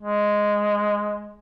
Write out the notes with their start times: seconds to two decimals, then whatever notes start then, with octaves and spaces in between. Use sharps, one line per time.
0.01 G#3